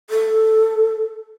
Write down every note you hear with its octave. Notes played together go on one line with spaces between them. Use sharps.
A4